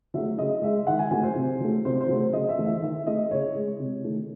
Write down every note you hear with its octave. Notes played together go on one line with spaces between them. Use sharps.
F#3 A3 E5
C#3 D#5
G#3 E5
D#3 F#5
G#5
F#3 A3 G#5
C5
C3
F#3 A3
C3 C5
C5
F#3 A3
C#3 D#5
E5
E3 A3
E5
D#3 E5
A3 D#5
C#3 C#5
G#3
C3
D#3 A3